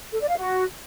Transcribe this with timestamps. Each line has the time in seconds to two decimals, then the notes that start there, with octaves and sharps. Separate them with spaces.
0.12 A4
0.21 D5
0.29 F5
0.38 F#4